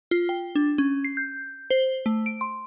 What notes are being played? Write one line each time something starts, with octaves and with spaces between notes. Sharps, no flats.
F4
G5
D4
C#4
C7
G6
C5
A3
D7
C6